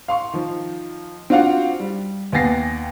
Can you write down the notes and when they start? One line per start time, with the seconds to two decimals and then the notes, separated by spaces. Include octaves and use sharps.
0.08 F5 C6 C#6
0.33 D#3 F3
1.30 C4 D4 F4 F#4 F5 F#5
1.80 G3
2.32 D#2 B3 G#5 A6 A#6 C7